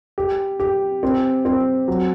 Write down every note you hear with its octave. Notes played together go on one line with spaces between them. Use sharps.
G4
G4
C4
C4
F#3